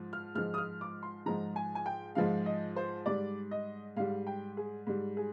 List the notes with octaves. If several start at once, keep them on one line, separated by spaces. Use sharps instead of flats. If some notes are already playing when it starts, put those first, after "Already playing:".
Already playing: G#2 F3
F6
G#2 F3 G#3 F6
D#6
F6
D6
C6
G#2 F3 G#3 A#5
G#5
G#5
G5
G#2 F3 G#3 F5
D#5
C5
G#2 G3 D5
D#5
G#2 G3 F5
G5
G#4
G#2 G3
G#4